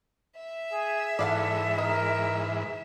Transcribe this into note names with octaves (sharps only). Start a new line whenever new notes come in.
E5
G#4
G#2 E3 A4 D5 F5 F#5
D#4 A#4